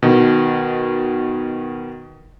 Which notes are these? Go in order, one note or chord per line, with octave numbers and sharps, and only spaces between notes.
B2 D#3